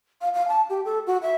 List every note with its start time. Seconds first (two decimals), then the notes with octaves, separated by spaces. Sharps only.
0.21 F5
0.34 F5
0.48 A5
0.70 G4
0.85 A4
1.07 F#4
1.22 E5